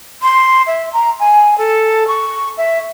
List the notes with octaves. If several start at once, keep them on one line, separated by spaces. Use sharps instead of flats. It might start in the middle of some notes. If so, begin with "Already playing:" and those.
C6
E5
A#5
G#5
A4
C#6
E5